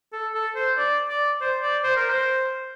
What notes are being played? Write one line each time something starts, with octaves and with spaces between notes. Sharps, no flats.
A4
A4
C5
D5
D5
C5
D5
C5
A#4
C5